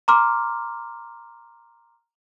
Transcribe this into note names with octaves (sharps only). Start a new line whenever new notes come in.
A#5 C6 D6 F6